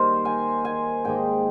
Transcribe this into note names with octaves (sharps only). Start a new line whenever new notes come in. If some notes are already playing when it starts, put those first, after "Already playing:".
Already playing: D#3 G3 A#3 A#4 C5
G#5
G#5
G#2 D#3 A#3 D#4 G5